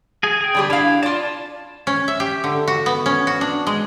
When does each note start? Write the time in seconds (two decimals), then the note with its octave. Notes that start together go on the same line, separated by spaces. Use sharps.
0.23 G#4 G#5
0.41 G#4 G5
0.55 D3 G3 G4
0.70 D4 E4 F5
1.03 F4 D5 A5
1.87 C#4
2.08 E5
2.20 G4
2.44 D3
2.68 F#4
2.86 B3
3.06 C#4
3.27 F#4
3.41 D4
3.67 G#3